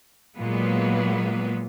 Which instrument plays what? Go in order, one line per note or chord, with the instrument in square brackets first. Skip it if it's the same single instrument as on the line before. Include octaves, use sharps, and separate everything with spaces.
[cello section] A#2 F#3 G#3 A#3 B3 B4